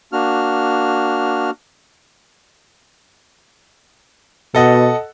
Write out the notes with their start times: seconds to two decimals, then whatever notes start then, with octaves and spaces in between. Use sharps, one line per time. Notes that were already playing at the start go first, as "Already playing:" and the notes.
0.12 A#3 D4 F#4 F6
4.55 B2 A4 D#5 F#5